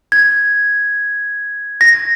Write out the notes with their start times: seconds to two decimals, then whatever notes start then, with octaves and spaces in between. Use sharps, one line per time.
0.12 G#6
1.81 A#6